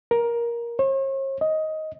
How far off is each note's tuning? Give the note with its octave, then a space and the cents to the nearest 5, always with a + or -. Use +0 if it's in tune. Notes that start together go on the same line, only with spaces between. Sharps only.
A#4 +15
C#5 -45
D#5 +10